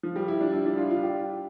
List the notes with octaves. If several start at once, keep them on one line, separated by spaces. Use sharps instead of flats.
F3
G3
E4
D4
E4
D4
F4
F4
G4